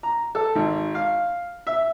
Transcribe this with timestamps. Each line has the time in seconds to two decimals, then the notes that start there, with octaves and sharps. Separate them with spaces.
0.03 A#5
0.35 A4
0.55 G#1
0.95 F5
1.67 E5